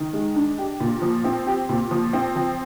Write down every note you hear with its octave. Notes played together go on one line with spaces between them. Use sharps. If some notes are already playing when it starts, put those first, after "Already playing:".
Already playing: D#3
G#3
D4
G4
A#2
F3
C4
G4
A#2
F3
C4
F3